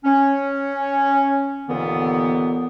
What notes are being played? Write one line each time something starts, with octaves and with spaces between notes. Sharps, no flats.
C#4
D#2 A#2 D3 E3 B3